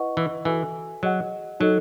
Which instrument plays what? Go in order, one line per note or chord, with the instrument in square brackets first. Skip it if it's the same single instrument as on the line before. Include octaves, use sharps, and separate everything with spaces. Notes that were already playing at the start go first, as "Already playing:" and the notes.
Already playing: [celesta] E4 B4 D#5 F#5 C#6
[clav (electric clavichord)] E3
[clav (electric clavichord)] E3 [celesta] F#4 A4 E5 G#5
[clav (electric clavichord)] F#3 [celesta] G#4 D#5 F#5
[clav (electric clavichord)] F#3 [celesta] D#4 A4 D#5